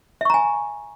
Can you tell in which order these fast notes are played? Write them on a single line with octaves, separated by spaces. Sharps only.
E5 C#6 A#5 G#5